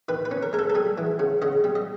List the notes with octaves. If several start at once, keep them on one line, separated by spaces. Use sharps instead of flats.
D#3 B4
B4
C#4
A#4
G#3 A#4
A4
A4
G3 G#4
E3
C#3
C#3 D#5
G3
D#5